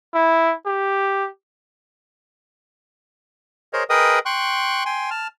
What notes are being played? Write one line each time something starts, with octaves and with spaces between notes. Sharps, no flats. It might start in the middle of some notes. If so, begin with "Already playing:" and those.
E4
G4
G#4 A#4 C5 C#5 D#5
G#4 A#4 B4 D#5 G5 D#6
G5 C6 C#6 F#6
G5 G#5 C6
A5 F6